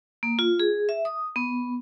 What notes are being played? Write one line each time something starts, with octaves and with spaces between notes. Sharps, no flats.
A#3
F4
G#4
E5
D#6
B3